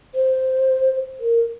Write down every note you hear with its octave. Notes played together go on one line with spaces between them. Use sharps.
C5
A#4